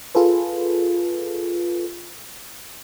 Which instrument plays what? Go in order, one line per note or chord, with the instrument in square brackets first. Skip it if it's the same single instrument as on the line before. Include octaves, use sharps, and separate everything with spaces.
[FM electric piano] F4 G#4 A4 B4